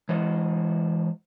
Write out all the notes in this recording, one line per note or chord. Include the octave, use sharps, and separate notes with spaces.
E3 G#3 C5 D#5 F#5